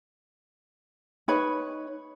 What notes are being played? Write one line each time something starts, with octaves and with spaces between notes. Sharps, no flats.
D#4 B4 C#5 B5